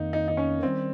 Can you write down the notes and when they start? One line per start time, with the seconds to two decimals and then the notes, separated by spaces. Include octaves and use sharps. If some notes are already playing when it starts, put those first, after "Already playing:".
Already playing: F2 D#3 A#3 D#4
0.13 D#4
0.28 D#4
0.37 C#4
0.63 D#3 G3 C4